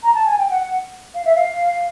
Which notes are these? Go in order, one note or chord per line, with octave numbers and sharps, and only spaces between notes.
A#5
A5
G#5
G5
F#5
F5
E5
F5